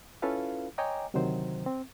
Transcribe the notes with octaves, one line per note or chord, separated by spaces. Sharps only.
C#4 E4 F4 A4 B4 F5
C#5 D#5 G5 G#5 A#5 D6
D2 C3 D#3 F#3 C5
C4